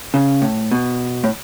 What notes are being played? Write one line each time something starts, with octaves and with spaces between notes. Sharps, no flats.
C#3
A2
B2
A2